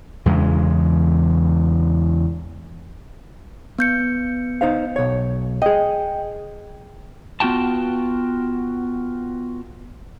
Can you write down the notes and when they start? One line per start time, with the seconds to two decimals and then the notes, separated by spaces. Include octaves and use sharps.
0.26 E2 C#3 G#3
3.79 B3 G6 C#7
4.61 D#4 C5 F5
4.96 B1 C#5
5.62 G#4 D#5 G5
7.40 B3 F4 F#4 G5 A5